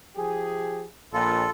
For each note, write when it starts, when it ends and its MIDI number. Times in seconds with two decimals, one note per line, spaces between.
0.16 0.83 53
0.16 0.83 67
0.16 0.83 68
1.13 1.43 34
1.13 1.43 46
1.13 1.50 65
1.13 1.50 69